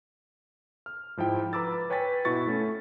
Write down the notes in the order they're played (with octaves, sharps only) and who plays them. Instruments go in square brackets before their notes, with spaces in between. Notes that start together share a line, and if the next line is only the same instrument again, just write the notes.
[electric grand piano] F6
G#2 F3 E4 G5
B4 A#5 B5 D6 E6 A6
B4 C#5 G5 G#5 A6 B6
B2 E4 F#4 C#6 A6
A3 C#4